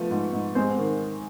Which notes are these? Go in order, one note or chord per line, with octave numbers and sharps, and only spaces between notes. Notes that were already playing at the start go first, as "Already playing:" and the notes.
Already playing: F3 A3 B3
G#2
G#2
G#3 C4 C5
D#3